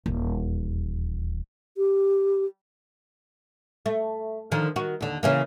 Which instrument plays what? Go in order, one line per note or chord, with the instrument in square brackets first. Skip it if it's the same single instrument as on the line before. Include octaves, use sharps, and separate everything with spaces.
[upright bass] D#1 E2
[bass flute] G4
[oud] A3
D3 D#3 F3
D#3 F#4
D#2 D3
C#3 E3 A#3